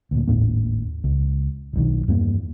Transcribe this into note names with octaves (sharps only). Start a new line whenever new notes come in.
D2 A#2
G#1 D#2 A2 A#3
C#2
D#1 B1 D#3
E2 G2 F#3 A#3